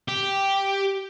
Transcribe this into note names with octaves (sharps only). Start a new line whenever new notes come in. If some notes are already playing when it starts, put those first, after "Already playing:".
G4